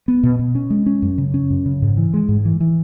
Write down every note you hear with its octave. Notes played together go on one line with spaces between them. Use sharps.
B3
B2
B2
C#4
G#3
C#4
F#2
C#3
C#4
F#2
C#3
G#2
E3
G#3
G#2
E3
E3